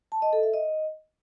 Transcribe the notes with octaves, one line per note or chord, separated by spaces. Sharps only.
A5
D#5
A4
E5
D#5